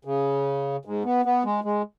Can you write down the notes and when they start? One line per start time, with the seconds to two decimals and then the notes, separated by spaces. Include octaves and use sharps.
0.05 C#3
0.85 G#2
1.04 B3
1.25 B3
1.45 G#3
1.64 G#3